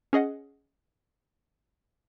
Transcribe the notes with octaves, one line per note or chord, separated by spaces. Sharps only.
C#4 G#4 D#5 F#5